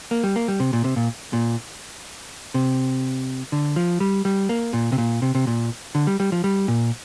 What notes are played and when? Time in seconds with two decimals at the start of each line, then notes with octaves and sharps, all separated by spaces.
0.11 A#3
0.24 G3
0.36 A#3
0.48 G3
0.60 C3
0.73 A#2
0.84 C3
0.96 A#2
1.33 A#2
2.54 C3
3.52 D3
3.76 F3
4.00 G3
4.25 G3
4.49 A#3
4.73 A#2
4.92 C3
4.98 A#2
5.22 C3
5.35 C3
5.47 A#2
5.95 D3
6.07 G3
6.20 G3
6.32 F3
6.44 G3
6.68 A#2